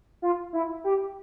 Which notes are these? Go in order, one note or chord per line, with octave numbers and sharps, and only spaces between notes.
F4
E4
G4